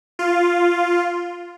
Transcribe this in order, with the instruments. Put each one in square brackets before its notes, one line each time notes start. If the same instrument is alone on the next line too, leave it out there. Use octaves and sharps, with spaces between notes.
[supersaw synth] F4